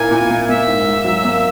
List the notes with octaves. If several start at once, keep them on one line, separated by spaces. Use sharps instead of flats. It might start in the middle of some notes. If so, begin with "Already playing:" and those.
Already playing: A#2 A#3 E4 A#4 G#5
A#2
A#3
A#3 E5
G#2
G#2
F#3
A#3